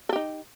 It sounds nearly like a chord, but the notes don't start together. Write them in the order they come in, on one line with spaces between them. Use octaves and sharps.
A4 G4 D#4